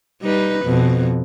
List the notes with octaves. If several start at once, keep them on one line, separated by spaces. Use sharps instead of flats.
G3 D#4 B4
F2 B2